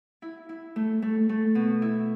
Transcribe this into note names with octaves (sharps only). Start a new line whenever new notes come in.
E4
E4
A3
A3
A3
B2
E4